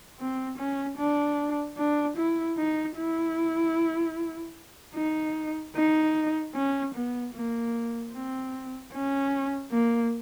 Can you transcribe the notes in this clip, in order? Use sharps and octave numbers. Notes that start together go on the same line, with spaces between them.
C4
C#4
D4
D4
E4
D#4
E4
D#4
D#4
C#4
B3
A#3
C4
C#4
A#3